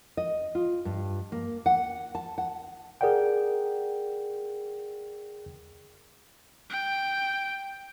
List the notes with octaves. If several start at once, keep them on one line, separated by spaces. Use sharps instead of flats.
D#5
F4
G2
A#3
F#5
A5
F#5
G#4 A#4 D5 F#5 G5
G5